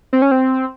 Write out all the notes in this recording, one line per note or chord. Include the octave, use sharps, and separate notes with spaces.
C4
C#4
C4